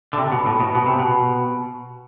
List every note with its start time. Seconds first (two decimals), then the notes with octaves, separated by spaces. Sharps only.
0.13 D3
0.18 C3
0.32 B2
0.45 A2
0.60 B2
0.75 B2
0.86 C3
0.99 B2